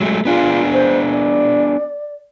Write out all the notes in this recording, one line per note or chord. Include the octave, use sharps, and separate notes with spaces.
F#3 G#3 A3
B3 D4 F4 G#4
C5
D5